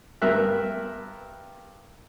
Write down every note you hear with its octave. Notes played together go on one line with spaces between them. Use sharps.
G2 B3 A#4 E5 F#6